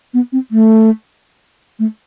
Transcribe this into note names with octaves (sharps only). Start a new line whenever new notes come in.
B3
C4
A3
A3